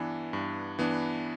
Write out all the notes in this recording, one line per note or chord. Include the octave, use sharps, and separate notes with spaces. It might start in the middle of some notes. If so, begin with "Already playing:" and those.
Already playing: G2 E3 B3 D4
G2
E3 B3 D4